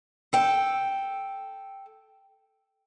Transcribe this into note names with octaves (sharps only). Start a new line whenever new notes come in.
A4 G5